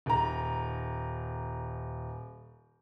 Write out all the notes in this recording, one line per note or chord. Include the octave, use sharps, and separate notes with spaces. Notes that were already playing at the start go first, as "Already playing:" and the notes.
D#1 A#5